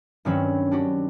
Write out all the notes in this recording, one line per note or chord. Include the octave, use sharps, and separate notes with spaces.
G2 D#3 F#3 C4 C#4 B5
D4 F#4 G4